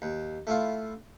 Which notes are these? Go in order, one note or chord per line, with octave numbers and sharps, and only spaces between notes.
D#2
A3 E4 F4